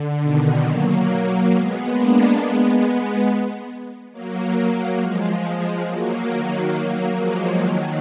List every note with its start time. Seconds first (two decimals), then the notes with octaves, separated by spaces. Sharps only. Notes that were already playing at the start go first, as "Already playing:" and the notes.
Already playing: D3
0.23 B2 D#3
0.65 F#3 A#3
1.52 G#3 B3
1.95 A#3 D4
2.39 G#3 B3
4.12 F#3 A#3
4.99 F3 G#3
5.85 F#3 A#3
6.28 D#3 F#3
6.71 F#3 A#3
7.15 F3 G#3
7.59 D#3 F#3